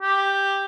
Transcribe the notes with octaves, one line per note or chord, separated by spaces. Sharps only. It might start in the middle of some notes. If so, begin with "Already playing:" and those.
G4